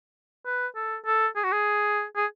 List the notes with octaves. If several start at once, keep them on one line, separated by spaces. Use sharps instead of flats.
B4
A4
A4
G#4
F#4
G#4
G#4